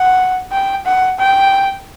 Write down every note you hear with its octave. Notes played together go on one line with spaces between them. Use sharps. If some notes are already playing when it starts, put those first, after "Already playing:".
Already playing: F#5
G5
F#5
G5